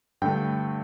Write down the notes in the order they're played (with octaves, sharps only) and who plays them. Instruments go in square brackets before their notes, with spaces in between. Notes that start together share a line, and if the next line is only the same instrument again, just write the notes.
[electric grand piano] G2 D3 A3 G5